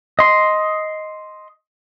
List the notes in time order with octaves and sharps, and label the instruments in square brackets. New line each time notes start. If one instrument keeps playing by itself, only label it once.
[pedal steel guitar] D#5 C6